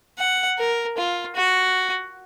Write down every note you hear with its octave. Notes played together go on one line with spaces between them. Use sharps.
F#5
A#4
F4
F#4